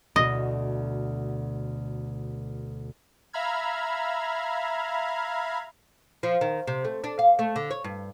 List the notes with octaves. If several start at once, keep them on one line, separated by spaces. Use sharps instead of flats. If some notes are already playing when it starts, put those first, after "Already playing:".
D2 B2 D#5
E5 F5 A#5 B5 F6 G#6
F3
D#3
C3
A3
D4
F5
A3
D3
C#5
G2